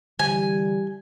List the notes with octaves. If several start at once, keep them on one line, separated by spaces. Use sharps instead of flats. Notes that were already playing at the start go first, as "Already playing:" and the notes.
D3 E3 G3 G#5